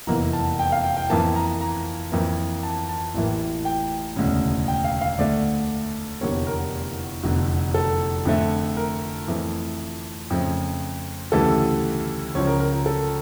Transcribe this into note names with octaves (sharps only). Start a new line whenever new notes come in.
F1 E2 E3 A#3 A#5
A5
G5
F5
G5
G5
F2 E3 A#3 A5
A#5
A#5
F2 E3 A#3
A5
A5
A1 A2 E3 A#3
G5
E1 D2 C#3
G5
F5
F5
D2 D3 A3 D5
F1 E2 D3 G3 A#3 C#5
A#4
F1 E2 D3
A4
F2 D3 A3
A#4
F2 E3 A3
F2 C#3 F3 A3
D2 C#3 E3 G3 A4
C#2 C#3 F3 C#5
A#4
A#4
A#4
A4